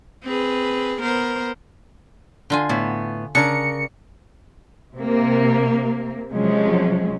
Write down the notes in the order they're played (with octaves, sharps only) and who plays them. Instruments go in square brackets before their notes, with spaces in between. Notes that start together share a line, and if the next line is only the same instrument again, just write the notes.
[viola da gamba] C4 G#4 B4
B3 A#4 C5
[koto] D3 F4 G#5
[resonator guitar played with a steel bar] A2 B3
[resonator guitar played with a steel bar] C#3 A#4 [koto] D4 [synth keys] C#7
[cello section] C3 A#3
C3 F3 F#3 G#3 C#4